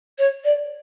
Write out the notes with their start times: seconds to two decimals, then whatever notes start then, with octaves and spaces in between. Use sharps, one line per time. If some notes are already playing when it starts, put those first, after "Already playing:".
0.18 C#5
0.44 D5